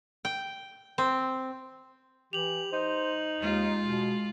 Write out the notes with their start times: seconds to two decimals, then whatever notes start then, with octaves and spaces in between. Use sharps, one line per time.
0.25 G5
0.98 C4
2.33 E3 G4 F7 F#7
2.72 D#4 C5
3.39 D#2 G#3 F4
3.82 B2